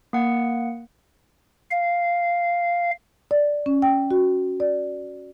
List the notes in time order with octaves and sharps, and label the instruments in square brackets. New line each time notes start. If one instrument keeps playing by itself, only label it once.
[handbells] A#3 F#5
[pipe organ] F5
[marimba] D5
C#4
G5
F#4
D5